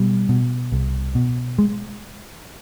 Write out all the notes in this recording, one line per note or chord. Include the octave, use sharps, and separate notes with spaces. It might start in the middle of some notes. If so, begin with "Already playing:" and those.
Already playing: B2 G3
B2
C2
B2
G#3